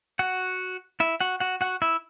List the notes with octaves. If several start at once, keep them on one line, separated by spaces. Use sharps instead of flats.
F#4 F#5
E4 E5
F#4 F#5
F#4 F#5
F#4 F#5
E4 E5